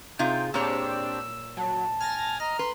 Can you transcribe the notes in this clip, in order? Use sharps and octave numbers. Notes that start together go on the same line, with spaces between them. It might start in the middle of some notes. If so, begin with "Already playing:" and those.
C3 D#4 F4 G#4 G5
A#2 C4 D4 G4 C#5 E6
F#3 A5
G#5 F6 A6 A#6
D#5 A#5 F6
B4 C6